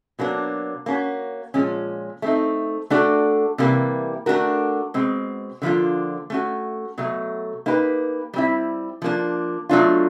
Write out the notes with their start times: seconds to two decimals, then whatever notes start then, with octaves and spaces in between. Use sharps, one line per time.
0.19 B2 F#3 A#3 D4
0.86 A#3 C#4 F#4
1.54 A#2 F3 G#3 C#4
2.22 A3 C4 D#4
2.90 A3 D4 F#4 A4 D5
3.58 C3 E3 G3 A#3
4.26 A3 D4 F#4 A#4
4.94 B2 G#3 C4
5.62 D3 F3 A#3 D4 F4
6.30 A3 C#4 F#4
6.98 B2 F#3 A3
7.66 A#3 D#4 G4 B4
8.34 G3 C4 E4
9.02 F3 A#3 D4
9.69 B2 F#3 A3 D4 F4